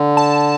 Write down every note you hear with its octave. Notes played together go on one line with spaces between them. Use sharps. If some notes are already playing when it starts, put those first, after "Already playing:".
Already playing: D3
A5